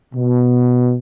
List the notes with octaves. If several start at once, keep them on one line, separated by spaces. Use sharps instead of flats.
B2